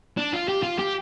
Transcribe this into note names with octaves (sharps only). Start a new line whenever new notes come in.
D4
F4
G4
F4
G4